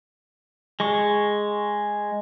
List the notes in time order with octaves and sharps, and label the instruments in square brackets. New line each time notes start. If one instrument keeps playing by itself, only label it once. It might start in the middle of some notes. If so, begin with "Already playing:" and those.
[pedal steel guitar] G#3 C#6